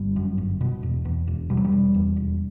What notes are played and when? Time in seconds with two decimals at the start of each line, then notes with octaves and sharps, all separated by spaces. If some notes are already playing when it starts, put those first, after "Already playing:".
Already playing: G1 G3
0.16 F#2
0.38 G1
0.61 B2
0.83 E1
1.05 E2
1.27 E1
1.50 B2 G3
1.57 F#3
1.65 G3
1.72 E1
1.94 E2
2.16 E1